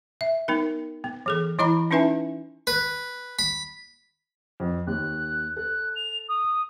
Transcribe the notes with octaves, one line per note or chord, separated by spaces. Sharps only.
E5
B3 D#4 A#4
B3
E3 G#4 A4
E3 E4 D#5 A#5 B5
C#4 D#4 E4 B4 E5 G#5
B4
B5
F2
D#2 F#6
A4 F#6
F7
D#6